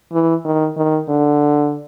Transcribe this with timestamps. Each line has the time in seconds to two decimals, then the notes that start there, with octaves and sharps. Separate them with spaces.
0.12 E3
0.45 D#3
0.77 D#3
1.09 D3